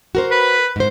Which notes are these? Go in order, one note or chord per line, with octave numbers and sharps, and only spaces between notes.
F#4 A#4 C5
B4
G#2 C5